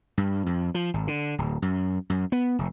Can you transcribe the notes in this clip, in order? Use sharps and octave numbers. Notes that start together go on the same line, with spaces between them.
G2
F2
F3
G#1
D3
D1
F#2
F#2
B3
F1